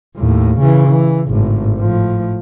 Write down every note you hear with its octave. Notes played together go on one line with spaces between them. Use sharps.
D#2 A2
C#3 E3
E3
G#1 A2
A2 F3